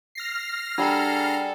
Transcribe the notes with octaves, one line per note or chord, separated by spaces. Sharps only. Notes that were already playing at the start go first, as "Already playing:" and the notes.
F6 A#6 C7
G3 D4 G#4 A4 F#5 A5 A#5 E6